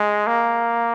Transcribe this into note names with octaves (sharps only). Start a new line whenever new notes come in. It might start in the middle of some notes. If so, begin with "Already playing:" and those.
Already playing: G#3
A#3